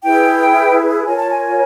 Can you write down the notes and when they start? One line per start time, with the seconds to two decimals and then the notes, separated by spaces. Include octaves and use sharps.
0.03 E4 G#4 B4 G5
1.05 F4 A#4 C#5 G#5
1.16 A5
1.30 G#5